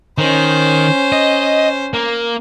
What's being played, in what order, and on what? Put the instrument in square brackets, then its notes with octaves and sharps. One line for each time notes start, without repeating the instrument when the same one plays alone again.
[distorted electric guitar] D#3 [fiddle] C#4 C5
[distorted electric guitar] D#5
A#3